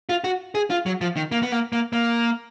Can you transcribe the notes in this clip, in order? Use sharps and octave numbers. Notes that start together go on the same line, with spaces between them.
F4
F#4
G#4
F4
F#3
F3
D#3
A#3
B3
A#3
A#3
A#3